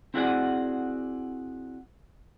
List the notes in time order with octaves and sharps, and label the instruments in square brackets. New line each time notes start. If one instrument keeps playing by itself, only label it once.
[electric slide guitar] C4 E4 F#4 G#4 D5 F#5